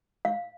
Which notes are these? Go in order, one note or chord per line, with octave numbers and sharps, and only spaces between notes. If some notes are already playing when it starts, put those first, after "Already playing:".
F5